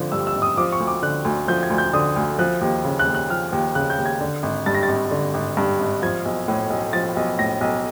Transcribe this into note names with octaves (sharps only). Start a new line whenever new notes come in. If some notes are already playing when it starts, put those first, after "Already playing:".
Already playing: G#1 D3 F3
G2 E6
E6
G#1
D#6
F3 D6
C#6
D2
D6
D3 F#6
D2
F3 G6
G#6
D2
G6
D3 D#6
D2
F3 F#6
D#2
C#3
F#6
D#2
F#6
F3 F6
D#2
C#3 F#6
G6
D#2
G#6
D3
G#1
G2 A6
A#6
A6
G#1
D3
G#1
G2
G#1
F3 G#6
B1
A2
B1
F3 A6
B1
A2 A#6
B1